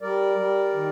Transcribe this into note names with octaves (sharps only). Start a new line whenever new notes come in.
G3 A#4 D5
G3
D#3